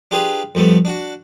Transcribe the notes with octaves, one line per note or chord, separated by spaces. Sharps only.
D4 F4 G4 G#4 B4
F2 G3 A3 B3
D4 F#4